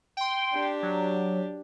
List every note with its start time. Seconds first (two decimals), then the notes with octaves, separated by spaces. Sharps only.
0.17 G5 C6
0.52 D4 G4
0.83 F#3